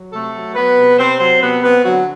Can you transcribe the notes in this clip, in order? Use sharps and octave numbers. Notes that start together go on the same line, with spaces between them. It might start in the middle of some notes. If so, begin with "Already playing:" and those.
Already playing: F#3
C3 A3 A4
F#3
F#3 B3 B4
C3
C3 C4 C5
F#3 C4 C5
C3 B3 B4
B3 C4 B4
D3 F#3 F#4